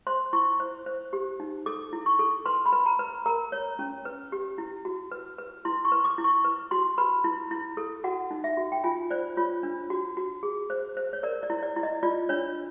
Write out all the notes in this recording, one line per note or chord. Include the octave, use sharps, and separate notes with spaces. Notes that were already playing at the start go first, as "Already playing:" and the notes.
C5 C6
E4 C#6
C5
C5
G4
D#4
A4 D6
E4
C#6
A4
B4 C6
B5
B4
A#5
B4
A#4 A#5
C#5
C#4
B4
G4
E4
F#4
B4
B4
E4 C6
C#6
B4
D6
E4
C#6
B4
F#4 C6
B4 B5
E4
E4
A4
F#4 F#5
D#4
E5
F#4
G5
F4 G#5
C5 D5
F4 C#5
D4
F#4
F#4
G#4
C5
C5
C#5
A#4 D5
D5
E4
D5
E4
D#5
F4 D5
D4 C#5